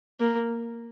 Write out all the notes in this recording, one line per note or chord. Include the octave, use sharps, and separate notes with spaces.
A#3